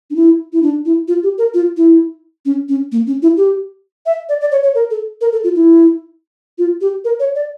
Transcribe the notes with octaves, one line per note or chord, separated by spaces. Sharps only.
D4
E4
E4
D4
E4
F4
G4
A#4
F4
E4
C#4
C#4
A#3
C#4
E4
G4
E5
D5
D5
C#5
C#5
A#4
A4
A#4
A4
F4
E4
F4
G4
A#4
C#5
D5